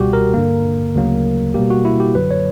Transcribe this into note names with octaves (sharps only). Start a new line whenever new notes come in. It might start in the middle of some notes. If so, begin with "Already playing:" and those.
Already playing: C#2 B2 G3 F#4 G4
A#4
G2 D3 A#3
D2 C#3 F#3 A#3
B2 G3 A#3 G4
F#4
E4
G4
F#2 D3 F#3 B4
C#5